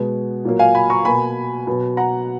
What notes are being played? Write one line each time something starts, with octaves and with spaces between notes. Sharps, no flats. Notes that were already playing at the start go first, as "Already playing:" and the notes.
Already playing: B2 G#3 B3
A#2 F#3 A#3
F5 G#5
G#5 B5
A#5 C#6
B2 A#3 G#5 B5
B2 F#3 B3
F#5 A#5